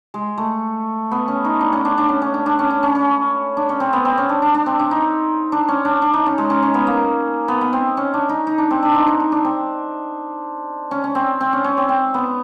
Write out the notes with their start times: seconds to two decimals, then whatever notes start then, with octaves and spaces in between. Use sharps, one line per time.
0.14 G#3
0.38 A3
1.11 B3
1.28 C#4
1.45 D#4
1.61 D4
1.73 C#4
1.85 D4
1.98 D4
2.09 C#4
2.22 C#4
2.34 D4
2.46 D4
2.59 C#4
2.70 D4
2.83 C#4
2.95 C#4
3.57 D4
3.69 C#4
3.80 C4
3.93 B3
4.05 C4
4.18 C#4
4.29 D4
4.42 D4
4.54 D4
4.66 C4
4.79 D4
4.91 D#4
5.52 D4
5.68 C#4
5.85 D4
6.02 D4
6.13 D#4
6.26 C#4
6.38 G#3
6.50 C#4
6.63 C#4
6.74 B3
6.87 A#3
7.48 B3
7.61 B3
7.73 C4
7.97 C#4
8.14 D4
8.29 D#4
8.47 D#4
8.58 D4
8.71 C4
8.83 D4
8.95 D#4
9.08 D4
9.20 D#4
9.32 D4
9.45 C4
10.91 C#4
11.04 C#4
11.15 C4
11.41 C4
11.53 C#4
11.64 C#4
11.77 C4
11.89 C4
12.14 B3